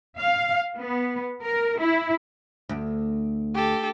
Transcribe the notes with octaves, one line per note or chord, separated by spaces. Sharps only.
F5
B3
A#4
E4
D2
G4 A4